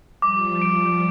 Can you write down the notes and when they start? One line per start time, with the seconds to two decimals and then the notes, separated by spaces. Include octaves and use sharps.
0.22 F3 G3 D6
0.62 D7